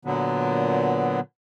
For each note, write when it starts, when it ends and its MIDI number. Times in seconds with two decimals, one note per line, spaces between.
0.05 1.20 46
0.05 1.20 50
0.05 1.20 54
0.05 1.20 59